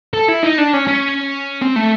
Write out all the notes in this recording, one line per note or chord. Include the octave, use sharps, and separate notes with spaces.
A4
E4
D#4
D4
C#4
C#4
C4
A3